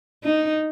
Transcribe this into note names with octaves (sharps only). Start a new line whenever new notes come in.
D#4